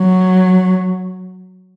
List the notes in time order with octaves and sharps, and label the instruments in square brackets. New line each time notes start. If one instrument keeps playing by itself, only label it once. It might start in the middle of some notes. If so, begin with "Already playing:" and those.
Already playing: [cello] F#3